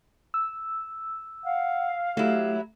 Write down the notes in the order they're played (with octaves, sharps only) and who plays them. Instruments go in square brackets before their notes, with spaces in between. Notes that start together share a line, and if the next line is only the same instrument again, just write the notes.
[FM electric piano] E6
[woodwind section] F5 [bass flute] F#5
[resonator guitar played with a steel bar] F#3 E4 [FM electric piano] A3 [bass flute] G4